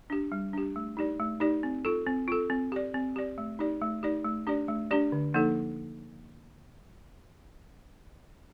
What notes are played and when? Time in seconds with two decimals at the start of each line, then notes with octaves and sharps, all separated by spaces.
0.10 D4 G4
0.32 G3
0.53 D4 G4
0.76 A3
0.97 D#4 G4 D5
1.20 A3
1.40 D#4 G4 D5
1.63 C4
1.85 F4 A4
2.07 C4
2.28 F4 A4
2.50 C4
2.72 G4 D5
2.94 C4
3.16 G4 D5
3.38 A3
3.59 D#4 G4 D5
3.81 A3
4.03 D#4 G4 D5
4.25 A3
4.47 D4 G4 D5
4.68 A3
4.91 D4 G4 D5
5.12 D3
5.34 F3 A#3 D#4 A4